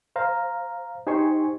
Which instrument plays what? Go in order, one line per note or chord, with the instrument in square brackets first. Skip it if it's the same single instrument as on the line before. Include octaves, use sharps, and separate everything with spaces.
[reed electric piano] C5 F5 A#5
D#4 G4 C5 G#5 C6 C#6